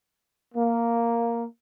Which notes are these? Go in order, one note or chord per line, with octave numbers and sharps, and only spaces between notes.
A#3